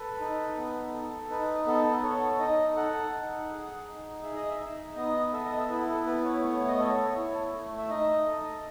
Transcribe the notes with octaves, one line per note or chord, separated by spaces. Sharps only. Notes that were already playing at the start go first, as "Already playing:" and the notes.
Already playing: A4 B4
D#4
B3
A4
D#4 B4
B3 A4
A4 C#5
D#4 D#5
A4 F#5
D#4
G#4
D#4
G#4 E5
D#5
E5
D#4
B3 D#5
A4 E5
D#5
E5
E4 B4
A4
B3 B4
C#5
A3 C#5
D#5
A4 C#5
E4
A3
E5
D#4 D#5
A4